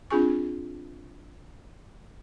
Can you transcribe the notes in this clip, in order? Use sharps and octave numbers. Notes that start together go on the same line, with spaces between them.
C4 D4 F4 G#4 G#5 C#6